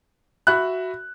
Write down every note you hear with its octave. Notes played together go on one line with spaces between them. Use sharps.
F#4 E5 B5 F#6